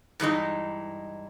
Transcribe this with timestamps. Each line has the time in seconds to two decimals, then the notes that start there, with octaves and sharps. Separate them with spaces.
0.20 G2 E3 G#3 D#4